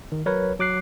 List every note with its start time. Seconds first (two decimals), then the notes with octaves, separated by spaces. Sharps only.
0.12 D#3
0.26 F#3 A#4 B4 C#5
0.59 F#3 D6 F#6 C7